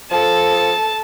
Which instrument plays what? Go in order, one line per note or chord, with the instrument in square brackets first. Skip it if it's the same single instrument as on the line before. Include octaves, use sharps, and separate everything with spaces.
[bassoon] F3 [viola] A4 [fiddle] A5